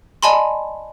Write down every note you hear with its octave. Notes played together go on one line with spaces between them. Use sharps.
D5 D#5 G#5 A5 B5 C6